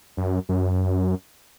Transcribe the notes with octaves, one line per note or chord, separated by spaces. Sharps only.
F#2
F#2